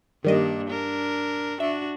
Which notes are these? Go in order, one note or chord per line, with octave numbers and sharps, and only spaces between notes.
G2 D#3 G3 A#3 D4 D#5
D4 A#4
D4 F#4 E5